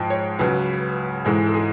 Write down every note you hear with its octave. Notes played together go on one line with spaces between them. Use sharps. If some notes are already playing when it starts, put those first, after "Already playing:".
Already playing: G#2 F3 G#3 G5 A5
C#5
C#2 C#3 F#3 B4
G#2 E3 G#3 A4
A4
G#4